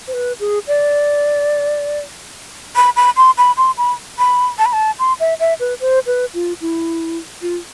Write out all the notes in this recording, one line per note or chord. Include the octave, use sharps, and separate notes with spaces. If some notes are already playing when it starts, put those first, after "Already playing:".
C5
B4
G#4
D5
B5
B5
C6
B5
C6
B5
B5
A5
B5
A5
C6
E5
E5
B4
C5
B4
F4
E4
F4